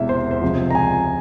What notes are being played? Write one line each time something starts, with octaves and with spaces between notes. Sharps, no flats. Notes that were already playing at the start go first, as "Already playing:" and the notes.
Already playing: E1 E2 C3 E3 E5
C5
C5
C#2 C3 F3
A#5
G#5